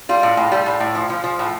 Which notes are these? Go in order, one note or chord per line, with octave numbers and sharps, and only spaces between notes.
G3 F4
A2
A2
G3
A2
A2
F3
F3
F3
A2